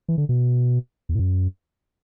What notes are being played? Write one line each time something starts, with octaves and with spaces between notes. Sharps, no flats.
E3
D3
B2
E2
A2
F#2